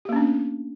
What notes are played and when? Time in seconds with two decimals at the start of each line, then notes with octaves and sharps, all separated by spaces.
0.05 G4
0.09 A#3
0.13 C#4
0.16 D4
0.20 B3